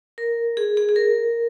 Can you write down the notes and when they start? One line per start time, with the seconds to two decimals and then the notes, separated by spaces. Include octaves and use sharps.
0.18 A#4
0.57 G#4
0.77 G#4
0.89 G#4
0.96 A#4